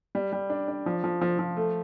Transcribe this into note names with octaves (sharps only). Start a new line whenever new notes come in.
G3
G3
D4
D4
F3
F3
F3
F3
A3